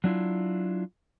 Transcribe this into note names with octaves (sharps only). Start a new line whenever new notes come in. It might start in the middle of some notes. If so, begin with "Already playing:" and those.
F#3 D4 E4 F4